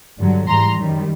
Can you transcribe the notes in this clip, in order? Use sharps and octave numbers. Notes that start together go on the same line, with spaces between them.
G2 D3 F#3
G#2 E3 G3 A#5 C6
F#2 D#3 G3